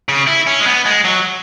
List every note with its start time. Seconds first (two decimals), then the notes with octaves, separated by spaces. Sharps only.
0.09 C#3
0.27 E4
0.47 C#4
0.60 G#3
0.67 B3
0.86 G#3
1.05 F#3